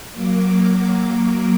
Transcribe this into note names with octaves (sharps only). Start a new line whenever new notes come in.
F#3 A#3 D6